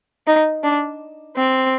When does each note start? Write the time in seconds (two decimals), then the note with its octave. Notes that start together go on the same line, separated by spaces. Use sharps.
0.27 D#4
0.64 D4
1.36 C4